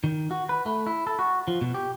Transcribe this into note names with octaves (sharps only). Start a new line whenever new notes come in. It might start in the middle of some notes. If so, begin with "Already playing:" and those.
D#3
F#4
B4
A3
E4
A4
F#4
F3
B2
G4